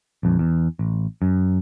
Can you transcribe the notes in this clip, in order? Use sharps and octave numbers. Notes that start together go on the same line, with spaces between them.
A#1 F2
E2
A1
F#2